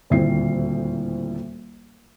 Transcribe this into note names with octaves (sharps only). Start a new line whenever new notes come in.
D#1 D2 A2 C4 C7